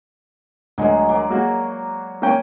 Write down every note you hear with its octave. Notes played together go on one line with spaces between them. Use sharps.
D2 F#3 G#3
F#3 D5
A#3 F#4 G#4
A#3 C#4 G5